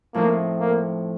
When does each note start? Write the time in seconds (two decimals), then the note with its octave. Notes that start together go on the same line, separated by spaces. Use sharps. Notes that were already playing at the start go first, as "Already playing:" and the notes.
0.14 A2 F3 A#3 C4 D#4
0.60 A#3